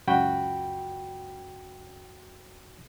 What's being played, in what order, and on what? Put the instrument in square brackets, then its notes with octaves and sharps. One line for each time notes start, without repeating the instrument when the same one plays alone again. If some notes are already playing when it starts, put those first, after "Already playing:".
[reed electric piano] C#2 F#2 F#4 G5 B5